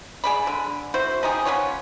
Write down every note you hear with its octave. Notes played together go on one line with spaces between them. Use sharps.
G#4 D5 B5
D3
E4 F#4 C5
F3 D#4 G4 G#4
B3 C#4 F4 C#5